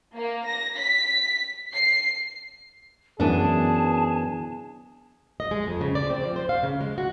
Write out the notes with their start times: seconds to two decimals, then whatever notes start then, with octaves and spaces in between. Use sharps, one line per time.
0.17 A#3
0.46 A#6
0.77 B6
1.74 C7
3.20 F#2 E3 B3 D4 G#4 A5
5.40 D#5
5.51 G#3
5.67 F2
5.81 C#3
5.95 D5
6.10 C4
6.23 F3
6.36 C5
6.49 F5
6.63 C#3
6.81 G#3
6.98 F#4